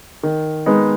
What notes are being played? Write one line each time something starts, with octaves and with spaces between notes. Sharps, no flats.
D#3
G#3 B3 D#4